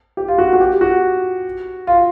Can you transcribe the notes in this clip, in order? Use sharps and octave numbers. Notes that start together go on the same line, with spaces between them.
G4
F4
F#4
F#4
G4
F#4
F4